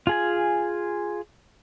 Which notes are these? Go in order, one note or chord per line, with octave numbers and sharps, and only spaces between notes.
F4 G#4 G#5